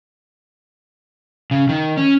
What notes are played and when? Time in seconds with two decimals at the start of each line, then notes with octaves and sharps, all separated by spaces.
1.51 C#3
1.69 D#3
1.97 C#4